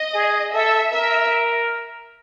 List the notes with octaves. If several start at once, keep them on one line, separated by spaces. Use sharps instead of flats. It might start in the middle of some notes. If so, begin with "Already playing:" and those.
Already playing: D#5
G#4
A4 E5
A#4 E5